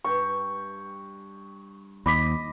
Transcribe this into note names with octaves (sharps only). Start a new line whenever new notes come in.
G2 G5 C#6
D#2 D#5 B5 D6 B6